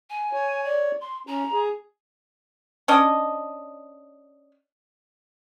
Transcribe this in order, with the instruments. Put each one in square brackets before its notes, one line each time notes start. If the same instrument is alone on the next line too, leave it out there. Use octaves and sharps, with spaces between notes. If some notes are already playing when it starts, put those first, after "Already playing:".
[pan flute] G#5
[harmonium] C#5
[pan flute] D5
C6
[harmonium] C#4 [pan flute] A#5
[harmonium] G#4
[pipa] C#4 D4 D#5